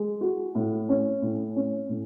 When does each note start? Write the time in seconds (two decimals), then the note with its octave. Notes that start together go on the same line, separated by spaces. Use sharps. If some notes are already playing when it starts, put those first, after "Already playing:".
Already playing: G#3
0.21 F#4
0.55 A2
0.89 C#4
1.22 A2
1.56 C#4
1.89 A2